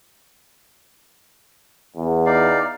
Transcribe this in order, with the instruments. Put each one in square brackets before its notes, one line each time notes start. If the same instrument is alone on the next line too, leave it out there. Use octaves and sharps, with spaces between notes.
[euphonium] E2
[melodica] D#4 D5 F5